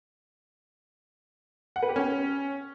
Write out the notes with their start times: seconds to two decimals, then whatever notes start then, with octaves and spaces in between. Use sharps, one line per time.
1.76 F#5
1.83 B4
1.89 G4
1.96 C#4